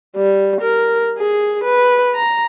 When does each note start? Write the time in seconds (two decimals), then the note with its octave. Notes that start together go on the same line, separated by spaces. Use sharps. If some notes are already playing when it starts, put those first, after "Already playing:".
0.16 G3
0.61 A#4
1.18 G#4
1.64 B4
2.15 A#5